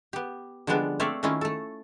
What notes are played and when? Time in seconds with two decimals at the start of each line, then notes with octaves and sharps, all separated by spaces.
0.13 B3 G4
0.67 D3 F3 G3 G#3 B3 D4
1.00 A3 C4 C#5 D5 E5 F5
1.23 D#3 A3 C#4 E4 F4
1.41 A3 A4